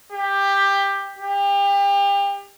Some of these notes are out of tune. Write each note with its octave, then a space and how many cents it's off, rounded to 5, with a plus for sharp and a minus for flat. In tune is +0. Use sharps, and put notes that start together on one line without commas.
G4 +15
G4 +35